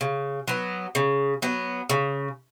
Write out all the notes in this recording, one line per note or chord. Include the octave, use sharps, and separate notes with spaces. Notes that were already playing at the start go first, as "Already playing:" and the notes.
C#3
F#3 B3
C#3
F#3 B3
C#3